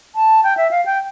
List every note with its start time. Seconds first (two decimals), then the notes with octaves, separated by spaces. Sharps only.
0.15 A5
0.44 G5
0.57 E5
0.71 F5
0.86 G5